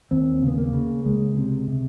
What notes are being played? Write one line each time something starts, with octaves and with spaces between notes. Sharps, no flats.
D#2 C4
C#3
B3
A#3
C#3
C#2 G#3
C3
C3